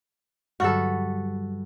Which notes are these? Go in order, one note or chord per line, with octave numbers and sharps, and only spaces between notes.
G2 D3 F#3 G3 F#4 A4 B5 F6